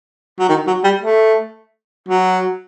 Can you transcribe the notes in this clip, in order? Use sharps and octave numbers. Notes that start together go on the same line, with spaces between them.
F#3
D#3
F#3
G3
A3
F#3